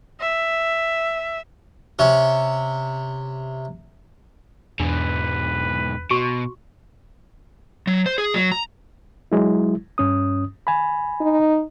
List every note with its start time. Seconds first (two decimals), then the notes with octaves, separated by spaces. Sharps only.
0.21 E5
1.99 C3 C#4
4.80 E2 G#2 B2 D4 B4
6.11 B2 F#4 C#6
7.87 F#3
8.06 C5
8.18 G#4
8.34 F#3
8.52 A#5
9.32 F#3 G#3 E4
9.98 G2 C#4 D#6
10.67 G#5 B5
11.21 D#4